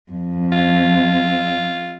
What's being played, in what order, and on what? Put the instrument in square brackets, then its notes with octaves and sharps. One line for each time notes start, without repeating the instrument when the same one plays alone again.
[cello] F2
[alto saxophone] F4